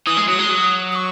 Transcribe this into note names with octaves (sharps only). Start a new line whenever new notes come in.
E3 D#6
G#3
F#3 D#6
G#3
F#3
D#6
C#6